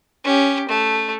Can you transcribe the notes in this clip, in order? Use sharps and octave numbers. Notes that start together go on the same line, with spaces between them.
C#4 G4
A3